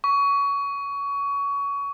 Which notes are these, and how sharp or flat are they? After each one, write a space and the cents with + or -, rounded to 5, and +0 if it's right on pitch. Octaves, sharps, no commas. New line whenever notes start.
C#6 +25